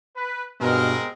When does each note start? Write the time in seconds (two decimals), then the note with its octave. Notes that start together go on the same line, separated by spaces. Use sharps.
0.16 B4
0.60 G2 B2 G#3 C4 A#4